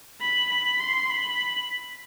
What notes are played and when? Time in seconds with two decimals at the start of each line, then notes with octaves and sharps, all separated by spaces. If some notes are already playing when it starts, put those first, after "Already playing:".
0.21 B5
0.50 B5
0.79 C6
1.10 B5